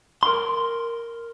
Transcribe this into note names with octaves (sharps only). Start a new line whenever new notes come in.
A#4 C6